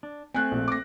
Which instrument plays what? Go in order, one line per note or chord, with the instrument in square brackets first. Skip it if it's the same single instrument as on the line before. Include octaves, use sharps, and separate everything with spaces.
[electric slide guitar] D4
[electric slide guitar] A3 C4 [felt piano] G#5 F#6
[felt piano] A#1 A#2
D6 A#6